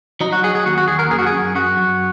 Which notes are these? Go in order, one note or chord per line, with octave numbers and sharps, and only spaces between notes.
F#3 D#4
F#4
F#3 G#4
G#4
D#2 F#4
F#4
D#2 G#4
A#4
F#2 G#4
F#4
G#4
F#2
F#2 F#4
F#2